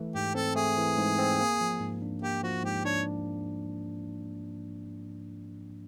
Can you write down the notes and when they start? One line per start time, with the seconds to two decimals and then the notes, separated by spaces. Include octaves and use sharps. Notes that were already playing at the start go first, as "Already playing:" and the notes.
Already playing: E3 A3
0.15 G#2 G4
0.35 C4 A4
0.56 A3 G#4
0.77 E3
0.98 G#2
1.19 C4
1.40 A#3
1.61 F3
1.80 G#2
2.02 D4
2.22 A#3 G4
2.43 F3 F#4
2.63 G#2 G4
2.85 D4 C#5